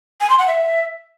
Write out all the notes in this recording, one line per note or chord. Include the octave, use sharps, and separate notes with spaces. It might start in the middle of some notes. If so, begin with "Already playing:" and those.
G#5
C6
F#5
E5